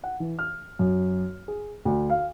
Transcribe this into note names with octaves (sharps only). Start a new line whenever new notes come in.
F#5
E3
F6
F#2
G#4
D2
F5